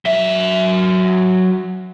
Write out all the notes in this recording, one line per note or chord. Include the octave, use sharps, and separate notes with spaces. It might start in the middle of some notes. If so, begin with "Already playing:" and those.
F#3 E5